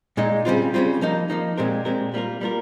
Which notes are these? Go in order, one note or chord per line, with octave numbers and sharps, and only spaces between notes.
A#2 G#3 D#4
C#3 G3 C4 F4
C#3 G3 C4 F4
F3 A#3 D#4
F3 A#3 D#4
A#2 G#3 C4 G4 A#4
A#2 G#3 C4 G4 A#4
G3 A#3 F4 A#4
G3 A#3 F4 A#4